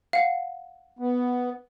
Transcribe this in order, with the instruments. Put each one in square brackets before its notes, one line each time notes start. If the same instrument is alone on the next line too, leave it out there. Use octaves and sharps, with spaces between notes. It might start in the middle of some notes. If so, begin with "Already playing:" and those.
[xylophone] F5 F#5
[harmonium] B3